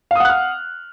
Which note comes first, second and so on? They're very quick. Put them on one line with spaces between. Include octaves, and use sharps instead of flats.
F5 D#6 F#5 F#6 F6